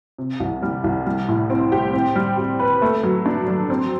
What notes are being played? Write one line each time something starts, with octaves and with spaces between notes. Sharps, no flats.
C3
C2
G3
C2
G3
A2
C4
G4
C4
G3
G4
B4
A3
F#3
D4
F#3
C4